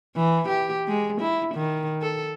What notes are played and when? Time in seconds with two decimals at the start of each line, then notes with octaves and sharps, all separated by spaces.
0.16 E3
0.48 G4
0.88 G#3
1.20 E4
1.54 D#3
2.02 A4